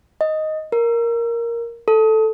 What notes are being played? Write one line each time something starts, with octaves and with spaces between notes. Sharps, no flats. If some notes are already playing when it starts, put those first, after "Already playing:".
D#5
A#4
A4